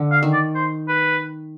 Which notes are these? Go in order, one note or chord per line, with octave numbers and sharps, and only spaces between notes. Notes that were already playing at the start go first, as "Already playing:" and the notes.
Already playing: D3
F5
D#3
D5
C5
B4